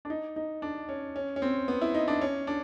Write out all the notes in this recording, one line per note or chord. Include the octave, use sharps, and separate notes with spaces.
D4
D#4
D#4
D4
C#4
C#4
C#4
C4
B3
E4
D#4
D4
C#4
D4